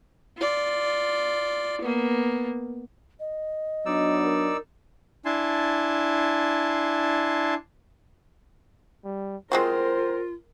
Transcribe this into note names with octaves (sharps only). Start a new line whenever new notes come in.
F4 D5
A#3 B3
D#5
F#3 B3 D4 D#4 D5 E6
A#4
D4 E4 G#5 A5 C6
G3
G#3 C4 F4 F#4 A#4 C5